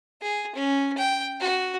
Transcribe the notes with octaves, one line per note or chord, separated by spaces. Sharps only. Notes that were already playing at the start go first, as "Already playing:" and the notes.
G#4
C#4
G5
F#4